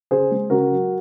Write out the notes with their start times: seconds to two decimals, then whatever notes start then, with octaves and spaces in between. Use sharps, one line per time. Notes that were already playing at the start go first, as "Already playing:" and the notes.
0.11 C#3 G#4 C5
0.31 G#3
0.50 C#3 F#4 A#4
0.71 F#3